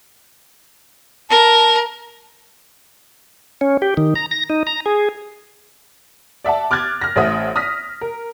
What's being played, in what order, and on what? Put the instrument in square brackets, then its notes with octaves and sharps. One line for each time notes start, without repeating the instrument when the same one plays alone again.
[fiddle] A#4 [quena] A5
[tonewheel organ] C#4
G4
D#3
A#5
A#6
D#4
A#5
G#4
[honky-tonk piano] D5 E5 F#5 A5
D6 F6 F#6 G#6 A6
F6 A#6
A1 A3 C5 E5 F#5 D#6
D#6 F6 A#6 B6
A#4